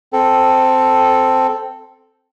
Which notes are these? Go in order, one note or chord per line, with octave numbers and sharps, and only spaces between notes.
C4 A4